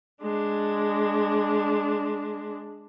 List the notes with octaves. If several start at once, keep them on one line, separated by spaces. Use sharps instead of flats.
G#3 D4